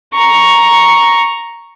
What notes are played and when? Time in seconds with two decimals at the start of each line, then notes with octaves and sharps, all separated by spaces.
0.14 A#5 C#6